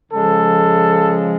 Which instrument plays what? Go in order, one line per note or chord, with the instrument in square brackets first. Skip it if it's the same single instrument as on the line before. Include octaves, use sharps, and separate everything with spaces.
[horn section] C#3 F3 G#3 A4